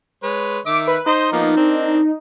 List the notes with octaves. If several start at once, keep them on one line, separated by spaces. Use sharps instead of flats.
G#3 B4 C#5
D#3 E5 D6
B4
D#4 C5 D#5 C6
F3 A#3 B3
C4 D4 A#4